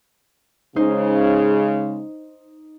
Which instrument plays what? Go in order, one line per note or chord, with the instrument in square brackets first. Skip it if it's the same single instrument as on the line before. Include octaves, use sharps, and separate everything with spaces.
[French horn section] C#3 G#3 [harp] D#4 C5